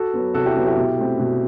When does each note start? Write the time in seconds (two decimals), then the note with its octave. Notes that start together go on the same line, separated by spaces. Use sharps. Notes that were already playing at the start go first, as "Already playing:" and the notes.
Already playing: F#4 A4
0.14 F#3 B3
0.34 C3 F#4 A4
0.45 E4 G4
0.56 F#3 B3
0.66 E4 G4
0.76 B2
0.98 A3 C4
1.20 B2